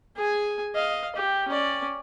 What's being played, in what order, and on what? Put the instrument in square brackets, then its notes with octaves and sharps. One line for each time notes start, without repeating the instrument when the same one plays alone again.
[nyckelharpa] G#4 G#5
D#5 F5
G4
C#4 D5